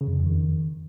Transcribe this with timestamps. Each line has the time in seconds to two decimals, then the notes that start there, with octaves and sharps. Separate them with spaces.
0.01 C#3
0.07 F2
0.13 E2
0.20 F2
0.26 D#3